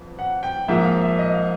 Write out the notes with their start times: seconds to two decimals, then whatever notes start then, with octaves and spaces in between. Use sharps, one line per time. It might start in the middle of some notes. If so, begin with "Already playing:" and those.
Already playing: G1 F2
0.19 F#5
0.43 G5
0.68 G#2 F3 A#3 E5
0.85 F5
1.02 E5
1.19 D#5
1.34 F5